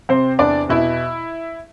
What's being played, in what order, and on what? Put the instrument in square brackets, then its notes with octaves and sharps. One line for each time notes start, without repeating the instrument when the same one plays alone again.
[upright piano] C3 C4 C5
E2 D4 D5
B2 E4 E5